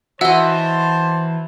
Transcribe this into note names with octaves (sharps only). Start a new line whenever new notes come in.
E3 F#4 C5 D#5 E5 F#5 A5 E6